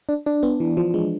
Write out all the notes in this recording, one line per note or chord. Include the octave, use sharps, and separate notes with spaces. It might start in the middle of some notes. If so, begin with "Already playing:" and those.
D4
D4
B3
E3
F3
G#3